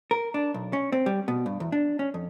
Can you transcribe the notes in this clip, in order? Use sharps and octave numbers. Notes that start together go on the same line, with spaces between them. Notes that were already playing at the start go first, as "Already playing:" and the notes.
A#4
D4
B1
C#4
C4
G3
B2
G2
E2
D4
C#4
F2